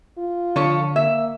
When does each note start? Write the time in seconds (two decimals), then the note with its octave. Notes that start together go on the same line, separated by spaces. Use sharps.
0.18 F4
0.56 D3 F3 A4 C#5
0.96 A#3 E5